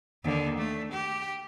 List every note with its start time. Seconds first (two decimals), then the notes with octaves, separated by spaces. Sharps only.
0.24 D#2 D3
0.58 A3
0.92 G4